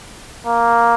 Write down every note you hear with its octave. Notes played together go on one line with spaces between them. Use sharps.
A#3